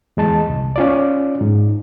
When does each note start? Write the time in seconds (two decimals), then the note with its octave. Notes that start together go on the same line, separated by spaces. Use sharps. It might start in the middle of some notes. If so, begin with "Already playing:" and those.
0.17 E2 G#3 A5
0.50 C2
0.76 C#4 F4 D5
1.41 G#2